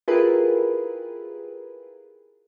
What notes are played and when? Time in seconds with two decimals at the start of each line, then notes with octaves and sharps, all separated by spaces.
0.08 E4 F4 G4 G#4 A#4 B4